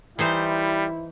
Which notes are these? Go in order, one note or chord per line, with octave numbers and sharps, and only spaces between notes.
E3 G3 D#4 E4 C5